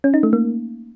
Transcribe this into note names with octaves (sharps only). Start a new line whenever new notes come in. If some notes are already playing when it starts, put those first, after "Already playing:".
C#4
D#4
A3
A#3